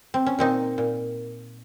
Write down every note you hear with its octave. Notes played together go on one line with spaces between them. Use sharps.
C4
C#4
A#2 C4 D#4
A#2